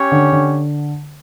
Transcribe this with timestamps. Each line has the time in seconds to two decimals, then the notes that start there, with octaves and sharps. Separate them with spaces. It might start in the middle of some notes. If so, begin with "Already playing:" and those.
Already playing: C#4 G4 C#5
0.12 D3
0.32 D3